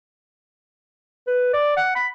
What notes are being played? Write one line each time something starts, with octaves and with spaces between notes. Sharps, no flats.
B4
D5
F#5
B5